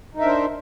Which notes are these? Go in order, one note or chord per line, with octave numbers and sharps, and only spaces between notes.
D4 D#4 A#4 C5 E5